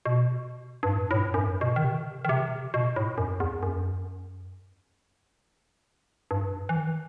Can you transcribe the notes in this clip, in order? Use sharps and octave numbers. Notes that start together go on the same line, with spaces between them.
B2
G2
A2
A2
G2
F#2
G2
B2
D#3
C3
D#3
C3
B2
A2
F#2
E2
F#2
G2
E3
D#3